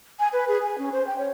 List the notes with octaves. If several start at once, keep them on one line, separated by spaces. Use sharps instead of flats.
G#5
B4
G#4
G#5
C#4
C5
G5
C#5